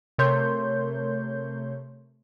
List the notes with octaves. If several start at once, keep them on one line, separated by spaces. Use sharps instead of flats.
C3 A3 A#4 C#5 C6 G6